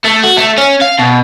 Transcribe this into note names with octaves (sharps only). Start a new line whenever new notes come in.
A3
F#4
A3
C#4
F5
B2